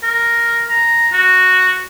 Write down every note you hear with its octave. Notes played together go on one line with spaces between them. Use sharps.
A#4
A#5
F#4